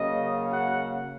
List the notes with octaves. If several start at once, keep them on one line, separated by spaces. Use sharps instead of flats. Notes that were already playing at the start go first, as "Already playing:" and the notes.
Already playing: C#3 F#3 A#3 D#5
F#5